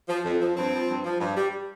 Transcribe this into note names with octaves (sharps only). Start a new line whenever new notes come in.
F3
F2
F3
G2 C4
F3
G2
F3
G2
G3